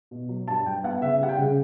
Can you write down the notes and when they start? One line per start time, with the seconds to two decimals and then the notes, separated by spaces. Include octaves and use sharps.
0.11 B2
0.29 F#3
0.48 G2 A5
0.66 G2 G5
0.83 B3 F#5
1.02 C#3 E5
1.20 G3 F#5
1.29 G5
1.38 C#3